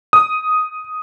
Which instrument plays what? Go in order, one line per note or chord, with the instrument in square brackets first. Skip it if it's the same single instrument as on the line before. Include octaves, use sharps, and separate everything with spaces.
[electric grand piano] D#6